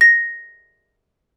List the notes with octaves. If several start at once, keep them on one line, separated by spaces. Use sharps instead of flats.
A#6